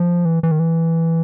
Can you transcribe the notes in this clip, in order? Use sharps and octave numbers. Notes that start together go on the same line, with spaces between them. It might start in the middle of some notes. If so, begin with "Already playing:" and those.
Already playing: F3
E3
E3
D#3
E3